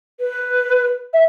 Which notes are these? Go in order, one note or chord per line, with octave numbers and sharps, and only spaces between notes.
B4
E5